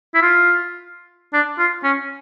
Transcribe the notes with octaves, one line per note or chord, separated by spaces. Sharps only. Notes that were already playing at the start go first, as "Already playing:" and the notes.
E4
F4
D4
F4
C#4